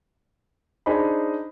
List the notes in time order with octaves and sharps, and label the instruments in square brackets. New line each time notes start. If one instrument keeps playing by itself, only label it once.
[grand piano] D4 D#4 G#4 C5 D#5 B5